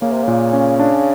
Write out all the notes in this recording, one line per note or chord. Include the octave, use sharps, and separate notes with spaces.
C#3 A#3
C3
A#2 C#3
C#4
D4